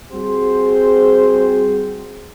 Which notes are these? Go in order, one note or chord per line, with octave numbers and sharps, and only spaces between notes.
G3 C4 F#4 G#4 C5